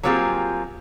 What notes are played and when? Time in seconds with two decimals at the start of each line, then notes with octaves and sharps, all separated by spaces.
0.03 F#3 A#3 C4 F4 G4 G#4